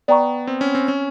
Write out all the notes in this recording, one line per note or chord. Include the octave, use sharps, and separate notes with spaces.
B3 D5 G5 A#5 C#6
C4
C#4
C4
C#4